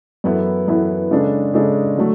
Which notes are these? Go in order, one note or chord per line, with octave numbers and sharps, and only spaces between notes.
F#2 E3 B3 E4 A4
F#2 E3 B3 E4 A4
C#3 G#3 D4 A4
C#3 G#3 D4 A4
D3 F#3 A3